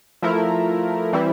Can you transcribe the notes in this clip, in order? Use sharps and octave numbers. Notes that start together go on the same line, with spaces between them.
F3 A3 E4 A#4
E3 G3 C4 E4